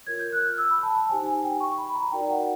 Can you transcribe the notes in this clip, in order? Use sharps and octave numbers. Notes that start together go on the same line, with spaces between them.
F4 A#4 C#5 G#6
G6
F#6
F6
E6
B5
A5
A5
D#4 G4 C5 G#5
G#5
G5
C#6
B5
A#5
D#4 F#4 A#4 D5 G5
F#5